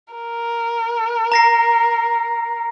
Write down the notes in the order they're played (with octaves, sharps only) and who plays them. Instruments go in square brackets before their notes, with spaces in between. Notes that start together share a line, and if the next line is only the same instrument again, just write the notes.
[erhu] A#4
[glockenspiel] A#5 A#6 C7